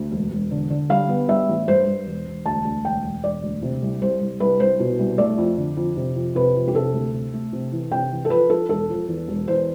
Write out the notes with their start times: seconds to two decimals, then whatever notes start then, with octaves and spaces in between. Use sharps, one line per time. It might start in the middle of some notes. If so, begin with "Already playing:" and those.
Already playing: D2
0.12 E1
0.31 E1
0.51 D3
0.70 D3
0.90 G3 F5
1.09 B3
1.28 G3 E5
1.49 A1
1.68 G2 C5
1.87 G2
2.07 E1
2.27 E1
2.45 D2 A5
2.65 D2
2.84 E1 G5
3.04 E1
3.24 E1 D5
3.43 D2
3.62 C3
3.82 C2
4.02 C2 C5
4.21 C2
4.40 C2 B4
4.60 C2 C5
4.80 B2
4.99 C2
5.18 A3 D5
5.38 F2
5.58 D3
5.77 F2
5.97 C3
6.16 F2
6.35 C3 B4
6.56 F2
6.68 G4
6.74 C3 A4
6.94 D2
7.14 C3
7.33 A3
7.53 C3
7.72 E3
7.91 C3 G5
8.11 E3
8.25 A4
8.30 F3 B4
8.49 F3 A4
8.69 E1 A4
8.89 F3
9.08 E2
9.28 E1
9.48 E2 C5